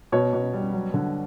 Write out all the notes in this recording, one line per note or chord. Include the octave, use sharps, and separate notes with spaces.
B2 C#5
B2
G3
F#3
D3